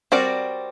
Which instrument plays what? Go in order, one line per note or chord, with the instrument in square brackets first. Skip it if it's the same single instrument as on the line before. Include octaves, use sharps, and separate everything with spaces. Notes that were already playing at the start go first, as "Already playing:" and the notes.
[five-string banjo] G3 C4 F#4 A#4 D5